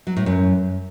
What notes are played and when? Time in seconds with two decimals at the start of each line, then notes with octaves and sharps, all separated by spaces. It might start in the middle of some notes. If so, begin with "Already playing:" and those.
0.07 F#3
0.16 A2
0.26 F#2